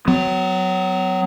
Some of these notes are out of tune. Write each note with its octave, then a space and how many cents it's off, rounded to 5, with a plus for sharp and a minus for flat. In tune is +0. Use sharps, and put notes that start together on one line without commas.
F#3 +0 B3 +40